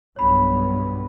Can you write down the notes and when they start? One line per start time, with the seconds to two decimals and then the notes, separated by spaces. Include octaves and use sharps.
0.16 B1 G2 B3 C#5 B5